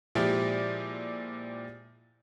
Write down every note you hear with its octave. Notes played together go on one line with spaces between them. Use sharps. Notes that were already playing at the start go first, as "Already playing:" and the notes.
A#2 F3 G#3 E4 G4